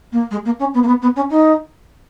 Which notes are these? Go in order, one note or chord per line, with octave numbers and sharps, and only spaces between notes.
A#3
G#3
A#3
C#4
B3
A#3
B3
B3
C#4
D#4